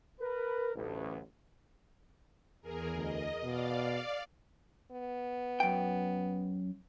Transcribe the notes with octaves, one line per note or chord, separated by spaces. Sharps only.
A#4 B4
A1 D2 G2
E2 G#4 A#4
D2 D#5
B2 D5 F5
B3
F#2 G5